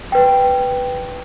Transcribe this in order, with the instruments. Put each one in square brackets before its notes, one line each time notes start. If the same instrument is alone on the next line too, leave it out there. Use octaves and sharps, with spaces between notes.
[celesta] B4 G5